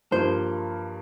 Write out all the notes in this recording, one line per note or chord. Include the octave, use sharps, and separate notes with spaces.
G2 F3 A#3 C5